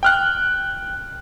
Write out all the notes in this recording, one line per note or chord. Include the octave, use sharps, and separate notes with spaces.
G5 F6 F#6